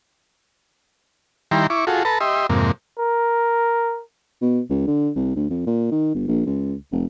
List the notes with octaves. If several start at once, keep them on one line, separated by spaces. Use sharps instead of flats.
D#3 G3 E4 G5 A#5 C6
E4 C#6 D6
F4 F#4 G#4 A4
A4 B4 A5 A#5
G4 D#5 E5 C6
F2 G#2 C3 A#3
A#4
B2
C#2
D3
C2
D2
F2
A#2
D#3
G1
A#1
C#2
F1